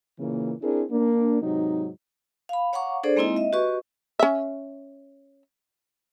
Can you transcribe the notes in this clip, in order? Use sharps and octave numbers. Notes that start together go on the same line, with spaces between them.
A#2 C#3 E3 A#3
C4 D4 E4 G#4 A#4
A#3 D4
G#2 C3 F#3 D#4
F5 B5
C#5 F5 F#5 A#5 C#6 D6
D4 G#4 A4 C5 D5
G#3 A#3 C4 D#4 E4 D#5
D#5 E5
F#4 G4 B4 D#5 C#6
C#4 E5